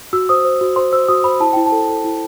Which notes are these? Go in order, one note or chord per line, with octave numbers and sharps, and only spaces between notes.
F#4 E6
C5 D#6
C5
F#4
C5 C6
C5 E6
F#4 D#6
C5 B5
E4 A5
E4 G5
A5
A4
A4
E4